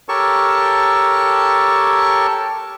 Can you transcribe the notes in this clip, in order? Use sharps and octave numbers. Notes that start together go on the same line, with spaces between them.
G4 A4 A#4 C#5 A5 C#6